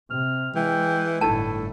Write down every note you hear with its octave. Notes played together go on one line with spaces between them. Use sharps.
C3 F6
E3 G#3 G5
G1 A2 A3 D#4 E4 A5